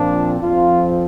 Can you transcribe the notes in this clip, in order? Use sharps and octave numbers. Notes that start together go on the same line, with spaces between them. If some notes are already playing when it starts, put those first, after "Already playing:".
Already playing: A#2 F3 C4 D4
F2 F3 C4 F4